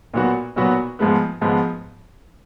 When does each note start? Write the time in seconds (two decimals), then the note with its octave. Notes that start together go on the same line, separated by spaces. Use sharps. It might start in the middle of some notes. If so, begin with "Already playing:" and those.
0.14 A#2 F#3 B3 F#4
0.56 A#2 F#3 B3 F#4
0.99 G#2 F3 G#3 B3
1.41 G#2 F3 G#3 B3